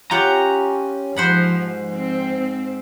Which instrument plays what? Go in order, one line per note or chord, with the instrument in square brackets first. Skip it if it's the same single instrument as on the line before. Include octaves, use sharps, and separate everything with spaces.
[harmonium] C#4 [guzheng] F4 G4 F#5 [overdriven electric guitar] A#5
[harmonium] G#2 [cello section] F3 [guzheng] C5 F#5 B5
[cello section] C4